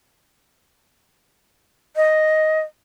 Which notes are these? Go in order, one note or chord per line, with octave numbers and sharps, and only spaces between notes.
D#5